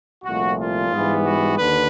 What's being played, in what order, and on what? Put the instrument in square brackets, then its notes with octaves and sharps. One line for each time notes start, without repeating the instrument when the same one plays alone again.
[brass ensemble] C2 A#2 F3 A3 F#4
F4
G#2 E3 G3 B3
F#4
D#2 D3 B4